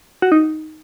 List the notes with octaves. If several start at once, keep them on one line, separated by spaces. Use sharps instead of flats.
F#4
D#4